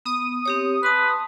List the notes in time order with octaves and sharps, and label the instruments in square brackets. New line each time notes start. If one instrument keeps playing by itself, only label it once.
[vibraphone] B3 [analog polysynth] D#6
[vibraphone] C4 G4 C#5
[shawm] B4 [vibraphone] A5 C6